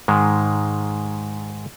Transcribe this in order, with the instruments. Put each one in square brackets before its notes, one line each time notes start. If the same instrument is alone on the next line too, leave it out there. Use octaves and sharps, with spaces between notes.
[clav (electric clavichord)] G#2 D#3 G#3